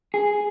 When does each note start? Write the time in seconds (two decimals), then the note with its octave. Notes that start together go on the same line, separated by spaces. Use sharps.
0.14 G#4